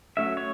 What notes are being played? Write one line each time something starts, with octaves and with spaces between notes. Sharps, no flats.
F#3 A3 C#4 E5
C#5